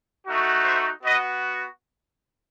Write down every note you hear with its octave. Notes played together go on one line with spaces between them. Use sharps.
A3 D#4 F#4
C5 E5
B3 F#4 B4 D#5